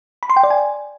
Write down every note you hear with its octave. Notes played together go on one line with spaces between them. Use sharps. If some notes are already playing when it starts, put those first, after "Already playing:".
B5
C6
G5
D5
G#5